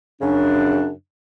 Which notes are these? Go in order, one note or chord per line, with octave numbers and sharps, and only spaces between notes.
F#2 C#3 D4